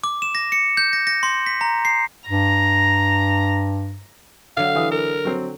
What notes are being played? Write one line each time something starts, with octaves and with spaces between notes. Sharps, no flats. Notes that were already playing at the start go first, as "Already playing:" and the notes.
D6
E7
A#6
C#7
G6
A#6
A#6
C6
B6
A#5
C7
G2 A#5
D3 F#3 F5
E3 D#6
A#4
F#3 C4